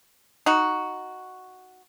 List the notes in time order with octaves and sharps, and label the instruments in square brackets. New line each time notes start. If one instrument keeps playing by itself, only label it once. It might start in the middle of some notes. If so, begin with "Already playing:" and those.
[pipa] D#4 F#4